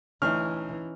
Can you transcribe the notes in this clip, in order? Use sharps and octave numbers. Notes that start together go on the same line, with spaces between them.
D2 E3 C#4 D#4 F6